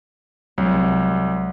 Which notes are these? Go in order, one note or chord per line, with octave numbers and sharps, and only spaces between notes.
C2 F#3 G#3